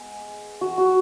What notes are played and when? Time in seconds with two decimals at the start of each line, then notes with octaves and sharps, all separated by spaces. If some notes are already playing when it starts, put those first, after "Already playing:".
Already playing: G#3 B3
0.61 F#4
0.78 F#4